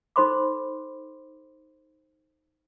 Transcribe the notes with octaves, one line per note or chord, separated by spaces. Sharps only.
D#4 A4 C5 B5 C6 D6